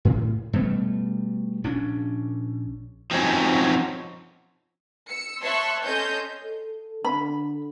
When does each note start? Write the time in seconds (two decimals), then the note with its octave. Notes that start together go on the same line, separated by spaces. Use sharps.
0.05 A2
0.53 B2 G3 A3
1.64 A#1 C#4 D4
3.11 F3 C4 C#4 D#4 F#4
5.08 E6 C#7
5.41 C#5 E5 A5 C6 C#6 F#6
5.83 C#4 A4 C#5 D#5 C6 G6
6.44 A4
7.05 D3 B5